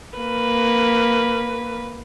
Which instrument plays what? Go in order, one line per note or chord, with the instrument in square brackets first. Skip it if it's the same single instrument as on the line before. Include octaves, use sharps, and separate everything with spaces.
[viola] A#3 B4